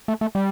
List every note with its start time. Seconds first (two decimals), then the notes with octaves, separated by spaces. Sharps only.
0.08 A3
0.21 A3
0.35 G3